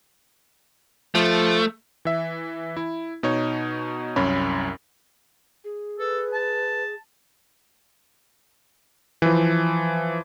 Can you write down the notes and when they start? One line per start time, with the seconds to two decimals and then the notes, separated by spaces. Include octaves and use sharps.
1.15 F3 A3
2.05 E3 E5
2.77 E4
3.23 B2 D#4 C#5
4.16 C2 F#2 C#4 C#5 B5
5.64 G#4
5.99 A4 B4
6.34 A5
9.22 E3 F3